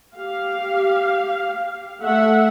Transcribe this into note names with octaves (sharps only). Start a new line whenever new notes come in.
G4 F5
A3 E5 F#5